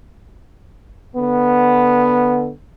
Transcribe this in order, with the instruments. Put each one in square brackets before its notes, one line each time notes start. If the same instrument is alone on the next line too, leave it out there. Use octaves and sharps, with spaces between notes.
[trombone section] D3 B3